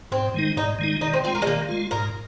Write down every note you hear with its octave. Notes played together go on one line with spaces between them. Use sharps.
G#2 C4
D#3 G#3 D#4
G#2 D#4
D#3 G#3 D#4
D#3 D#4
C4
G#3 C4 F4
A#3
G#3
D#3 A#3
G#3 F4
G#2 A#4